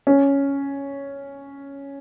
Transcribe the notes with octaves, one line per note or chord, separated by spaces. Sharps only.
C#4